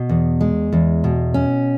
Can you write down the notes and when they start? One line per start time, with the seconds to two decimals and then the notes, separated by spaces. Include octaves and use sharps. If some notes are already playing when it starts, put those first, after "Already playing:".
Already playing: B2
0.09 E2
0.41 G#3
0.72 E2
1.04 B2
1.34 C#4